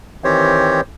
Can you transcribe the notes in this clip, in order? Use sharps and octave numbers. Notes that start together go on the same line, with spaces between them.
D#3 E3 C4 G4 C5 C#5